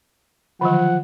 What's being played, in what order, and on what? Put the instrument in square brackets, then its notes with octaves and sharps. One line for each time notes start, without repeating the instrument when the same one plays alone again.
[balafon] D3 D#3 F#3 [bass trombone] F3 [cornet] F#5